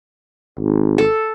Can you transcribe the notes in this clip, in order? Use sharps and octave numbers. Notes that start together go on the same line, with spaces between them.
G#1
A4